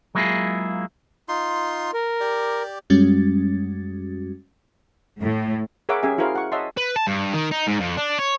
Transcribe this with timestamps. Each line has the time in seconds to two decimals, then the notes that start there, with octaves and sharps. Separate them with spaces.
0.15 F#3 G#3 A#3 E4 F4 G#4
1.28 D#4 F4 C6
1.94 A#4
2.20 G4 D5
2.90 F#2 G3 G#3 C#4 F#4 A6
5.22 A2
5.89 G#4 A#4 C#5 E5 F#5 D6
6.03 C#4 G4 G#4 E5 G#5
6.18 E4 F#4 G#4 A#4 C5 F5
6.35 F#5 C#6
6.52 C#5 D#5 E5 F#5 A5 C6
6.77 B4
6.96 A5
7.07 G2
7.33 D#3
7.51 D#4
7.67 G#2
7.80 F2
7.97 D4
8.19 C#5